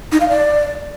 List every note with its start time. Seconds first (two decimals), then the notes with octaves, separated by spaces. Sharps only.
0.12 D#4
0.20 F5
0.29 D5